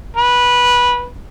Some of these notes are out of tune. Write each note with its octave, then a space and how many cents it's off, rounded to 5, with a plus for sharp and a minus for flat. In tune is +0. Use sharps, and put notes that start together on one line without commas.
B4 -15